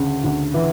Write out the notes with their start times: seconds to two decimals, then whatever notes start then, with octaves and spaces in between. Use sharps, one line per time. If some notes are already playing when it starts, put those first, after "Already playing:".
Already playing: D2 C#3
0.24 D2
0.54 E3